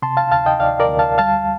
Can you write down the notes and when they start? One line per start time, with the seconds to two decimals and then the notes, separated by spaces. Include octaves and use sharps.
0.02 C3 A5 C6
0.17 F5 A5
0.31 D2 F5 A5
0.46 D#5 G5
0.60 D2 D5 F5
0.80 A#4 D5
0.89 D2
0.99 F5 A5
1.18 G3 F5 A5